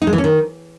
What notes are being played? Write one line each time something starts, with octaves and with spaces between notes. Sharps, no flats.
D#4
G#3
E3
C#4
D#3